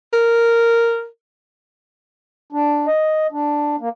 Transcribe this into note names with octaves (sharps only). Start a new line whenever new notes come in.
A#4
D4
D#5
D4
A#3